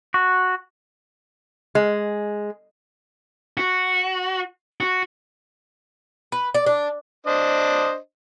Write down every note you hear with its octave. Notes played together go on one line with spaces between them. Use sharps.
F#4
G#3
F#4
F#4
B4
D5
D4
D4 C5 D#5